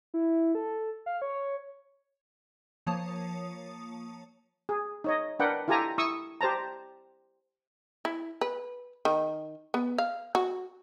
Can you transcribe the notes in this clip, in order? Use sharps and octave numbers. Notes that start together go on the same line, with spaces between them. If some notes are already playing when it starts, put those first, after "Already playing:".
E4
A4
F5
C#5
F3 A#3 C#5 A5 D#6
G#4
D#4 C#5 D#5
D4 A#4 B4 D5 F#5 G5
E4 F4 G4 A4 G#5 A#5
E4 C#6 D#6 E6
G4 C5 A5 A#5
E4
B4
D#3
B3
F5
F#4